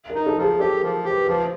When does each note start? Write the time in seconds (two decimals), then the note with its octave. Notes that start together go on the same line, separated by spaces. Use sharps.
0.10 A#4
0.15 D#4
0.26 A4
0.37 F3 G#4
0.59 G4 A4
0.76 A#4
0.83 F3
1.05 G4
1.10 B4
1.26 F3 B4